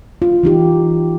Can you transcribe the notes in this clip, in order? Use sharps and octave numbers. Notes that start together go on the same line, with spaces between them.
F4
E3 D#4 G4